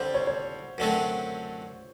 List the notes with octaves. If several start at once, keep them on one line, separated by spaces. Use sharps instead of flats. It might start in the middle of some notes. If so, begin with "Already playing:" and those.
Already playing: D3 G3 C4 C5
C#5
C#5
F#2 D3 F#3 A3 C4